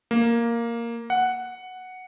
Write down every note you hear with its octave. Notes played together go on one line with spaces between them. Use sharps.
A#3
F#5